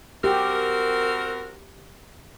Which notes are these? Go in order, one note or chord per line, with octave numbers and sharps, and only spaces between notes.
C4 F#4 G4 A#4